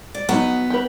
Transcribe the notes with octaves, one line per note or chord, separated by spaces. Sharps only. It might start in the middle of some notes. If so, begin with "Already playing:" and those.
D5
F#3 B3 D#4
G4 B4